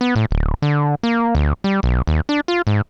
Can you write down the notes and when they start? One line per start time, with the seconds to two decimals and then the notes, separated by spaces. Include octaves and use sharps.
0.01 B3
0.16 A2
0.31 D1
0.62 D3
1.03 A#3
1.35 D2
1.64 G3
1.83 B1
2.07 D#2
2.29 D4
2.48 F4
2.67 G#2